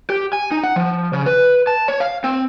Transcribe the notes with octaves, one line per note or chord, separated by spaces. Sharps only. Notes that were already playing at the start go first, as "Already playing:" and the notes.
G4
G#5
D#4
F#5
F3
C#3
B4
A5
C#5
F5
C4